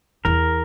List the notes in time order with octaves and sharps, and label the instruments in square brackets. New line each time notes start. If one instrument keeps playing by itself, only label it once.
[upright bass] E2 [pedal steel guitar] A#4